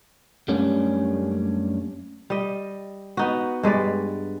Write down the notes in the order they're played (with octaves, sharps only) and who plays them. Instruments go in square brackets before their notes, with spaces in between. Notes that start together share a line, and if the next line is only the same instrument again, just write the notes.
[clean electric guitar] F#2 G3 A3 A#3 C#4 D4
[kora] G3 D#5
B3 D#4 F#4
G2 G#3 B4 D5